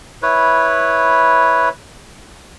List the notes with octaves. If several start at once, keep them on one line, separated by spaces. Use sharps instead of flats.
E4 B4 C#5